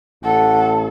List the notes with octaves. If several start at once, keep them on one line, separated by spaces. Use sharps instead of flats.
A1 A4 F#5